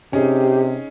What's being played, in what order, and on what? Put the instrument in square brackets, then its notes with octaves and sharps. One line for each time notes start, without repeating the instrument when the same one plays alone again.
[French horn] C3 [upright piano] C#4 D#4 G#4 [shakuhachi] G4